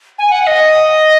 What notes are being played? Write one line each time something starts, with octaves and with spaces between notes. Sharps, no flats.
G#5
F#5
F#5
D#5